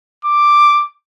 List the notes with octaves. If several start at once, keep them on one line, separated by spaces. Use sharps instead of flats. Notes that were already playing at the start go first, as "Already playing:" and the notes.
D6